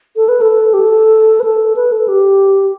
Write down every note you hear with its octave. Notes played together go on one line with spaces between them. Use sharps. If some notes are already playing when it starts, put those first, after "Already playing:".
A4
B4
A4
G4
A4
B4
A4
B4
A4
G4